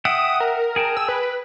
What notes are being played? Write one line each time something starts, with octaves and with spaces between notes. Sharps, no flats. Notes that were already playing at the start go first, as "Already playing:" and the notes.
E5 F#5 G5 D#6
A#4
G#4 G5 A5
E6
B4